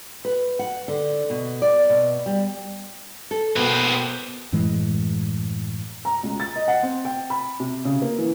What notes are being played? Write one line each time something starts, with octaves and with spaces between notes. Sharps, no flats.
B4
F#5
D3
B2
D5
B2
G3
A4
B2 A#3 C4 B4
F#2 A2 E3 G#3
A#5
C#2
A6
D#5
F#5
C4
G5
B5
C3
C#3
A#3
E3